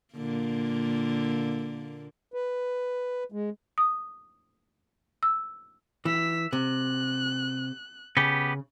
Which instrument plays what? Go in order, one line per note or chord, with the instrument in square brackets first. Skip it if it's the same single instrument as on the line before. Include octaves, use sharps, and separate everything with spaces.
[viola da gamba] A#2 D3 A#3
[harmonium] B4
G#3
[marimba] D#6
E6
[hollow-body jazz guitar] E3 [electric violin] E6 B6
[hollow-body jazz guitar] C3 [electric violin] F#6
[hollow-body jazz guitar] C#3 [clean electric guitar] B3 G4